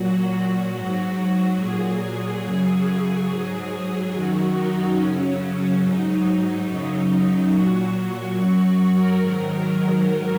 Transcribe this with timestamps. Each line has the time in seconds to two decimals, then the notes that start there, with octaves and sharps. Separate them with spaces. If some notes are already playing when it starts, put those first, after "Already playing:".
Already playing: A#2 F#3 F#4
0.76 G#2 F#3
1.59 A#2 F#3 G#4
2.45 F#2 C#3 F#3
3.29 G#2 F#3
4.13 F#2 D#3 F#3 F#4
4.56 D#4
4.98 F#2 C#3 F#3 C#4
5.82 G#2 F#3 D#4
6.67 F#2 C#3 F#3
7.52 A#2 F#3 F#4
8.36 F#2 F#3 F#4
8.65 F#4
8.93 A#4
9.21 G#2 D#3 F#3
10.06 G#2 D#3 F#3